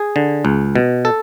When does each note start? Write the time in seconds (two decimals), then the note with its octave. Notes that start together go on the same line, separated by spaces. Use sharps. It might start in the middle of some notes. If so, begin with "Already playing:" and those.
Already playing: G#4
0.16 D3
0.45 C#2
0.76 B2
1.05 A4